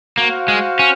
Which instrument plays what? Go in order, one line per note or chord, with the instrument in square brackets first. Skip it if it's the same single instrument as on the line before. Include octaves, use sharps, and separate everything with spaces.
[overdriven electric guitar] A#3 [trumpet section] F#4 C5 F5
[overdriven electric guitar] G#3
C#4